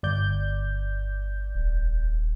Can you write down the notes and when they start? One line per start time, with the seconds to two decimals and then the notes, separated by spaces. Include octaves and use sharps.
0.03 G1 D5 G6
1.54 D#1